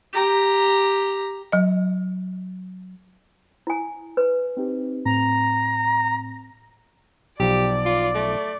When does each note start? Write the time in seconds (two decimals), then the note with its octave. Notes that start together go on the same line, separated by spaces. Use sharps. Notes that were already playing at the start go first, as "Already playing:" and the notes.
0.13 G4 A#5
1.52 F#3 D#5
3.67 E4 G#5
4.17 B4
4.57 C4 D#4 G4
5.05 A2 C4 A#5
7.40 B1 F3 G4 D5
7.85 F4
8.15 A3